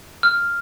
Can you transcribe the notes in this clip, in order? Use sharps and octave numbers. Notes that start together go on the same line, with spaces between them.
F6